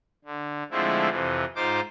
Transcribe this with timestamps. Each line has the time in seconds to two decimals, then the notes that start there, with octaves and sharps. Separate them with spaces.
0.25 D3
0.71 D3 F3 G#3 A3 C4 E4
1.09 F2 C3 E3
1.55 G#2 D#4 F4 C5 D6